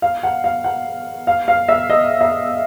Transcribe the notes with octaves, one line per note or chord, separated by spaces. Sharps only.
F5
F#5
F5
F#5
F5
F5
E5
D#5
E5